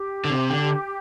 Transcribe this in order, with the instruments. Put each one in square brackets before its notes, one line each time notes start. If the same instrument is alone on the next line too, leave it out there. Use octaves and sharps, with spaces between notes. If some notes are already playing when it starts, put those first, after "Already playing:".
Already playing: [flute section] G4
[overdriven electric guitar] D3
C3
D3